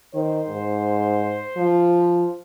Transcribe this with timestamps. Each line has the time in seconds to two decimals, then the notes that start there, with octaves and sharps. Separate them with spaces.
0.15 D#3 C5
0.49 G#2
1.57 F3